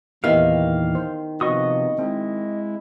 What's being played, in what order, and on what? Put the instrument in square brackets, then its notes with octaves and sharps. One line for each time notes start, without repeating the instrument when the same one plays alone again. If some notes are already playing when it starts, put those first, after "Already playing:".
[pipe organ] E2 A#2 E3 [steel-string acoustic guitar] D#3 [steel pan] B3 E4 G4 [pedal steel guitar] F5
[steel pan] C5
[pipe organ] C3 F3 B3 [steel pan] F#4 [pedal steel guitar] D#5 C#6 D#6
[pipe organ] G#3 E4 [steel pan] C4